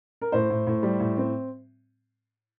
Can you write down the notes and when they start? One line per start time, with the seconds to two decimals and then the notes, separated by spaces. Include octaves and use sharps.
0.22 A#4
0.32 A2 C5
0.50 A2
0.67 A2
0.83 G3
1.00 A2
1.18 C4